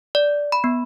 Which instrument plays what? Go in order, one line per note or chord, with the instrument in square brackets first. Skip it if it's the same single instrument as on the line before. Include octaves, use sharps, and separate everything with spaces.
[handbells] D5
B5
B3